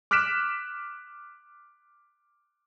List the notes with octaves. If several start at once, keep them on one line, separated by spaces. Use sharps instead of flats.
D6 F6 F#6 B6 D7 E7